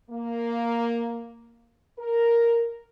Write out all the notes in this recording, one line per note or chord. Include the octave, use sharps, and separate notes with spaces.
A#3
A#4